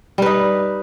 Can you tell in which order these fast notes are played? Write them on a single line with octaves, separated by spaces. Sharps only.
G3 B4 D#4